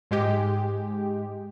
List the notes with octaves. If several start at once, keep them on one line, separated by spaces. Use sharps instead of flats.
G#2 G#3 G4